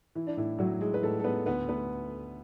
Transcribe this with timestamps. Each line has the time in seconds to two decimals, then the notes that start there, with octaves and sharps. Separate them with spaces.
0.15 E3 E4
0.27 D4
0.37 A2 E4
0.59 A2 F#3 F#4
0.81 G#3 G#4
0.94 B4
1.03 A2 A3 A4
1.20 A4
1.24 G#3 B3 B4
1.46 D2 B3 B4
1.69 A3 B3 B4